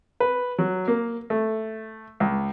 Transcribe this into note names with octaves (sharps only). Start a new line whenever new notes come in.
B4
F#3
A#3
A3
C#2